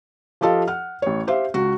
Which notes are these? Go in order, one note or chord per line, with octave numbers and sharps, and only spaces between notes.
F3 F4 G4 A4 D#5 F5
F#5 F6
A1 C#5
G4 C5 E5 F5
C#2 F#4